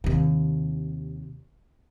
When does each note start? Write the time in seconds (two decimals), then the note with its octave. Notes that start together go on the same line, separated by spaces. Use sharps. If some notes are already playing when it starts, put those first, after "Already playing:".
0.04 D#2 C3